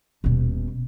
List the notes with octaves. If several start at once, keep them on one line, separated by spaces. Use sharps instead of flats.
D#1 B2